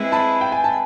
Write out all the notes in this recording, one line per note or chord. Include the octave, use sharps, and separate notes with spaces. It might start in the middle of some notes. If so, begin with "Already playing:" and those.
Already playing: G#3 C4 E4 G#4 B4
A5 B5
G5
G#5
A5